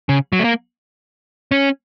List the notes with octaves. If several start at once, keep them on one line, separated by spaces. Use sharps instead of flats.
C#3
F#3
A3
A#3
C#4